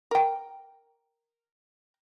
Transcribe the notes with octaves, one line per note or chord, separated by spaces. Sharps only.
A#4 G5